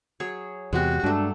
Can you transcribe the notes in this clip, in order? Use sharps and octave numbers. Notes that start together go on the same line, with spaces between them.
F#3 G#4 C#5
E2 C3 G#3 F#4 G4
G2 F#3 G#3 A3 D4